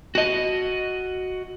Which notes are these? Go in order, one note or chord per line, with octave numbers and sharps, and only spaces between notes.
F#4 D#5